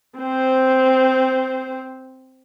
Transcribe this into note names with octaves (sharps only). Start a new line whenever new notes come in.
C4 C5